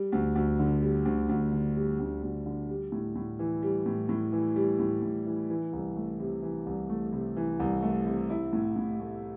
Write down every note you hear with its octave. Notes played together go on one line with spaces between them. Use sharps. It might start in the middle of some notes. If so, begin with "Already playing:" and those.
Already playing: G3
D2
D2
D3
G3
D2
D2
D3
G3
D2
D2
D3
G3
A2
A2
E3
G3
A2
A2
E3
G3
A2
A2
E3
E3
C2
A3
C3
E3
C2
A3
C3
E3
C2
A3
C3
E4
A2
A2
A3